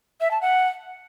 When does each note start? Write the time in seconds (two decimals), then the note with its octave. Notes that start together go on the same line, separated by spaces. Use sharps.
0.21 E5
0.31 A5
0.41 F#5